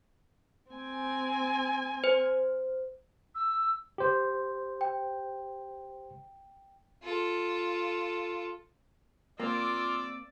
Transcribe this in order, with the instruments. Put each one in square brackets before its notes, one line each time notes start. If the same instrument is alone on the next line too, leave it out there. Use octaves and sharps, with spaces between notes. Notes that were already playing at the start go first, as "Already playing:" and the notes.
[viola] C4 G#5
[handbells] C5
[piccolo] E6
[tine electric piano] G4 C5
[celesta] G5
[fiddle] F4 A4
[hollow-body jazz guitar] A#3 C4 [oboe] F4 [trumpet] D5 [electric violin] D6 E6